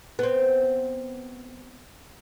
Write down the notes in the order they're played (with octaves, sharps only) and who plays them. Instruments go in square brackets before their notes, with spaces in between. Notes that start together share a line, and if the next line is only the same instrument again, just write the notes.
[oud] B3 C4